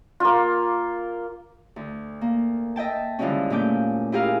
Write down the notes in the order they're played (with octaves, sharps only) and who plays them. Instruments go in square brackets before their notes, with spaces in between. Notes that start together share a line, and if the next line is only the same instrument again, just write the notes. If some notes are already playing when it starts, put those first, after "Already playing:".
[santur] A#3 F4
[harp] D2
A#3
D#5 E5 G5 A5
D3 E3 F3 G3 G#3 C#4
A#2 A3 C#4 D6 G6
E4 F4 G4 G#4 A#4 F5